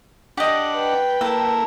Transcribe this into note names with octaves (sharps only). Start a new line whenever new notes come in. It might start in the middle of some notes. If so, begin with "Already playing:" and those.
D4 G4 D#5 F#5
B4 G5
A#3 E4 A4